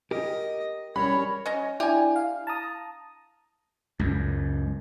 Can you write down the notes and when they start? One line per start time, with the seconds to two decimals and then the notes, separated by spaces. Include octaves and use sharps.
0.11 G4 A#4 D#5
0.96 G3 C#4 A#4 C#5 B5
1.46 C#4 D#5
1.80 D4 E4 G4 G#5
2.16 F5
2.47 A5 A#5 D#6
3.99 C#2 F#2